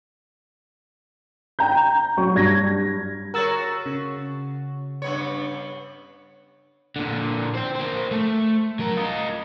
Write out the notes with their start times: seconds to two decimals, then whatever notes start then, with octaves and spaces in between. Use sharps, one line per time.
1.59 G5 A#5 G6
2.17 F#3 C#6
2.35 G2 G#6 A#6
3.34 F#4 G#4 A#4 C#5 E6 A6
3.86 C#3
5.02 G2 B3 C#5
6.96 A#2 D3
7.55 C5 G5
7.76 A#3 C5
8.11 A3
8.79 F#3 A#4
8.97 F4 D#5